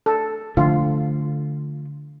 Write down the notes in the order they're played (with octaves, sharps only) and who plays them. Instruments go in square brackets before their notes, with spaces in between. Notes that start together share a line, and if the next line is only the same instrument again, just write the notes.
[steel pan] A4
[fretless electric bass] D3 F3 A3 [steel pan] F4